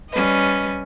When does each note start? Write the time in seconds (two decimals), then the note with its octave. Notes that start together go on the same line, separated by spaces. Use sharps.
0.10 G3 C#4 B4 D#5